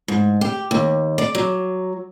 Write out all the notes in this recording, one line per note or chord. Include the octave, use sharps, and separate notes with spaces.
G#2
G4
D#2
D5
F#3